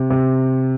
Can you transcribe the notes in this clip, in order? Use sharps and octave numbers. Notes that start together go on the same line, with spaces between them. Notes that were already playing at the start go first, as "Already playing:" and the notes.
Already playing: C3
C3